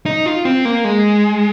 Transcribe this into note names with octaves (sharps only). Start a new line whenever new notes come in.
D#4
F4
C4
A#3
G#3